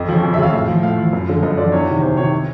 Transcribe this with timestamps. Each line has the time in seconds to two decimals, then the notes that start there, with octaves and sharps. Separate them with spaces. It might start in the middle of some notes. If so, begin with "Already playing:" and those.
Already playing: F2 D#5
0.09 C#3 F3
0.23 F2
0.34 E5
0.38 C#3 F3 F5
0.53 A2 E5
0.68 F3
0.83 A2 F5
0.98 F3
1.13 F#2
1.28 D3 F3
1.43 F#2 D#5
1.57 D3 F3 D5
1.72 E2 C#5
1.88 C3 D#3
2.02 E2 C5
2.17 C3 D#3 C#5
2.33 C#5